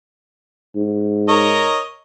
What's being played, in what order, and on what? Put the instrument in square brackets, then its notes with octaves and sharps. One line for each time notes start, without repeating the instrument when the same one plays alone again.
[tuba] G#2
[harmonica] A#4 C#5 D#5